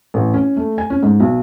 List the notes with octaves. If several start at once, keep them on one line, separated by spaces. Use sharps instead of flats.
A1
C#4
A3
G#5
C#4
G#2
B1